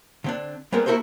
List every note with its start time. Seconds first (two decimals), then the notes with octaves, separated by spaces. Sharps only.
0.24 D3 C4 D4
0.72 G3 G#3 B3 C4 A#4
0.86 A#3 E4 F#4 A4 A#4 C5